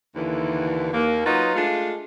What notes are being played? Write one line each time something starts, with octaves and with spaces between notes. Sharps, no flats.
D#2 D3 E3
D#2 A#3
F#3 D#4 F4 F#4 B4 D#5
G#3 A3 D4 F4